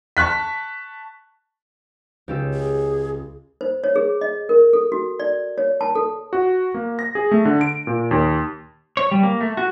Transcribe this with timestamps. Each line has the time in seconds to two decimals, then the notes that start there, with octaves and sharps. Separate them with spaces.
0.17 A5 C#6 F#6 B6
2.28 C#2 G4 E6
2.54 G#4
3.61 C5
3.84 C#5
3.96 G#4
4.21 D#5
4.49 A#4
4.73 A4
4.92 F#4
5.20 D5
5.58 C#5
5.81 A5
5.95 A4
6.33 F#4
6.74 A#3
6.99 A#6
7.15 G#4
7.31 A3
7.45 D3
7.61 D7
7.87 A#2
8.11 D#2
8.97 C#5
9.11 G3
9.23 A#3
9.41 A3
9.57 F#4